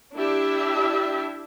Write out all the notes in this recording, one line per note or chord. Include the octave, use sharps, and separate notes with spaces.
D4 E4 G4 E5